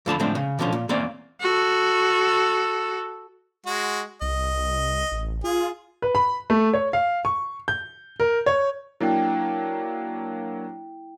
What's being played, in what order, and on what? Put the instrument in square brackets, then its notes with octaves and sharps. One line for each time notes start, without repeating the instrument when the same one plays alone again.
[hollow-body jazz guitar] F2 D3 A5 B5
A2 D3 F3 G#3 C4 D4
C#3
B2 D3 F3 G3 C#4
A#2
E2 A#3 C4 C#4 D5 F5
[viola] F#4 A4
[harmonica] G#3 F#4
[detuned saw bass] C2 [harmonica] D#5
[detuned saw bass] A1
[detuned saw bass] F4 [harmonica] G#4
[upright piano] B4
B5
A3
C#5
F5
C#6
G6
A#4
C#5
[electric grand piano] F#3 A#3 D4 [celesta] E4 G5